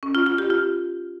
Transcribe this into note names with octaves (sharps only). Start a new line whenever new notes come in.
C#4
F4
F4
G4
F4